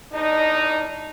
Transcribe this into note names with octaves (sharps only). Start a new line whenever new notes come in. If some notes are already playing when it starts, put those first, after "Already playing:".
E2 D4 D#4